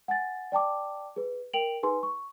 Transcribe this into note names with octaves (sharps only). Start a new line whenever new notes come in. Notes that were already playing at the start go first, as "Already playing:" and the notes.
F#5 G#5 A6
D5 G5 A5 D6
G#4 B4
A#4 G5 D7 F7 F#7
D#4 G#4 B4 G#5 C6
C#6